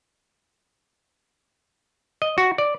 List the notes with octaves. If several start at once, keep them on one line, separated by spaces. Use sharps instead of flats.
D#5
F#4
D5